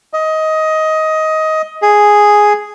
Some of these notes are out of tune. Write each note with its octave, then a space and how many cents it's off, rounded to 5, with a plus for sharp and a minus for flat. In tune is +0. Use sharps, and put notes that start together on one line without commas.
D#5 +15
G#4 +0